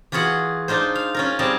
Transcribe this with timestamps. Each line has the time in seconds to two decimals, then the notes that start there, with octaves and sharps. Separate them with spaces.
0.12 E3 F4 F#4 G#4 F#5
0.68 D4 D#4 F4 C5
0.95 F5
1.14 C#4 F4 A#4
1.39 G3 C4 G#4 A#4 A5